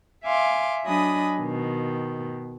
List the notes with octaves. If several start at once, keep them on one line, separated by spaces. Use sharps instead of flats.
E5 F5 G#5 C6 D6
F#3 D4 D#5 G#5 B5 D#6
B2 D#3